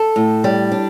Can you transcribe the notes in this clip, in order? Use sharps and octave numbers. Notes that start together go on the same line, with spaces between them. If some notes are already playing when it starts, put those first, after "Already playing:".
Already playing: A4
A2
G3
D4